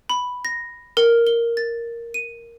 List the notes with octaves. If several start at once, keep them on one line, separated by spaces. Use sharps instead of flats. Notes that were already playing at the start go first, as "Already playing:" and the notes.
B5
A#6
A#4
G7
A6
D#7